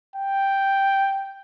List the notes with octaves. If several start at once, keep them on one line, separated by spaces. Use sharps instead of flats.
G5